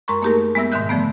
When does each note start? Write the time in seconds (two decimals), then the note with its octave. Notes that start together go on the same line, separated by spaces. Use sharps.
0.08 F#2 G#3 A#4 A#5 C6 C#6
0.22 A3 A#3 D#4 G4 G#4 A#4
0.55 G#3 B3 E5 E6 A#6
0.72 G#2 B2 D#3 E5 F#6 G6
0.89 D3 F3 G3 A3 B3